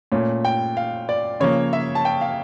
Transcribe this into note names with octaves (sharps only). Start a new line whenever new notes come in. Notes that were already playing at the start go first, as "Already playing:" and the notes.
A#2 A3 C#4
G5
F5
D5
C#3 F3 A#3 C#5
E5
A5
G5
F5